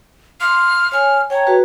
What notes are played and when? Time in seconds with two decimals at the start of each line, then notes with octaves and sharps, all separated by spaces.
0.41 C6 D6 F6
0.92 C#5 G#5 F6
1.30 C#5 G5 A5 A#5
1.47 F#4 G#4 B4